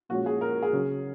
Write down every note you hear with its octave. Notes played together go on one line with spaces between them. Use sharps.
A#2 F3 G#3 C#4 F#4
G#4
A#4
G#4
C#3 F#3 C#4